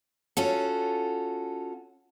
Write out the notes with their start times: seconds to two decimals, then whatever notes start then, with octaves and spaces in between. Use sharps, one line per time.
0.37 C#4 F4 F#4 A4